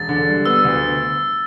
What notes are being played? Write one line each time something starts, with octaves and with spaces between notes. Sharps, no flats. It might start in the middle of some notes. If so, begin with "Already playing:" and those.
Already playing: E1 A6
D3
G3
B3 E6
D2